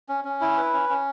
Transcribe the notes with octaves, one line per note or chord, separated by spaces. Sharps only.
C#4
C#4
E4
B4
C#4
C#4